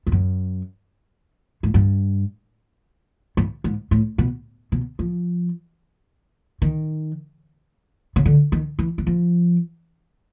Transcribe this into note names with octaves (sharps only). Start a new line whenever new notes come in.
F2
F#2
G#2
G2
G2
G#2
A2
B2
B2
F3
D#3
C#3
D3
D#3
E3
E3
F3